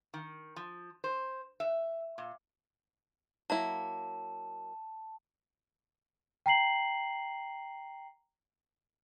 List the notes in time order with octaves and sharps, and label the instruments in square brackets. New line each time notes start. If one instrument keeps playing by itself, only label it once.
[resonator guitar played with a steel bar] D#3
F3
C5
E5
A#2
[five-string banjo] F#3 A#3 E4 [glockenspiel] A5
[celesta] G5 A#5 C7 F#7